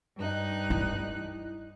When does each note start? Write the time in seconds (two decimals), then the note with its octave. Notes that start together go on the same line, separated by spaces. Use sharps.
0.17 G2 D#4 F#6
0.70 E4